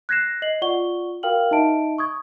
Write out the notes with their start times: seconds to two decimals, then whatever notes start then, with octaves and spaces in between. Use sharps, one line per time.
0.09 F#6 G#6 A#6 C7 E7
0.42 D#5 C7 F#7
0.62 F4 D5 F#5 C#6 G7
1.23 F#4 A#4 F5 G5 F6 F#7
1.51 D#4 D#5 E5 A5 D7
1.98 C#6 D#6 G#6